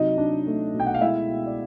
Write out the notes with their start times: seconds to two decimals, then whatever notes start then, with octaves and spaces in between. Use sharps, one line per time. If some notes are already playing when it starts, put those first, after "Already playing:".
Already playing: C3 F#3 D#4 D#5
0.18 D4
0.46 A3
0.74 B2
0.80 G5
0.86 F#5
0.94 F5
1.02 G#3 E4 E5
1.29 B2
1.46 D5